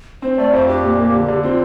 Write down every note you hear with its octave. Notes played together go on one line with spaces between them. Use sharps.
C4 C5
C5
A3 D5
F2 C5
D4 G4
A#2
A#3
D3
D3
C4 F4